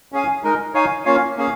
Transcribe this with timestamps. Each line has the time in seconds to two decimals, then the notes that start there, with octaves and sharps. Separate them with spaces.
0.12 C#4 G#4 F5 G#5
0.43 G#3 D#4 A#4
0.74 D#4 C#5 F5 G#5
1.05 A#3 C#4 F4 C#5 F5
1.37 A#3 C#4 G#4 F5